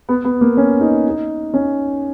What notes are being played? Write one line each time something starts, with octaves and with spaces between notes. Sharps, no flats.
B3
B3
A#3
C#4
D#4
D#4
C#4